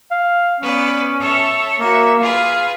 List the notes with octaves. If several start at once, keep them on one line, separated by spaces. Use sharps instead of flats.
F5
B3 C#4 B4 D5
A4 C#5 E5
A#3 F#4 E5
F4 G#4 B4 F5